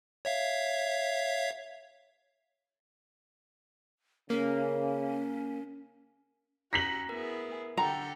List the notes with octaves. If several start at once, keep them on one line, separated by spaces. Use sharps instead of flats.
C#5 E5 F5
C#3 A#3 C#4
C#4 F#4 A#5 A#6 B6 F#7
B3 E4 G#4 A#4
D3 G4 A4 F#5 G5 A#5